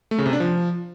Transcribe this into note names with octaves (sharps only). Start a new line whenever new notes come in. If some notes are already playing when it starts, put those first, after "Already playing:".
A3
C#3
C3
D4
F3